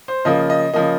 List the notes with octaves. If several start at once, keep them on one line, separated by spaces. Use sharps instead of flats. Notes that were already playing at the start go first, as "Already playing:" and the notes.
C5
C#3 F3 A#3 D#5
D#5
C#3 F3 A#3 D#5